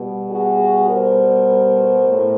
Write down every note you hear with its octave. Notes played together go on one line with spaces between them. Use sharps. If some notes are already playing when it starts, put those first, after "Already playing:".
Already playing: B2 G3
F#4 G#4
A#4 C5
A2